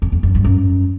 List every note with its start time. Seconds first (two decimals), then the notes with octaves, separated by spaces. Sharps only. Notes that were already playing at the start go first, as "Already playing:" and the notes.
0.02 F2
0.12 F2
0.23 F#2
0.35 G2
0.45 F#2